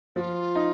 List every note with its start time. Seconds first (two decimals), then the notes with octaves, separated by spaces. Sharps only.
0.16 F3 F4 F#4
0.55 D#4